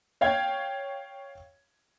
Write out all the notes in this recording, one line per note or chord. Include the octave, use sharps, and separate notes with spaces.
C#5 F5 G5 G#6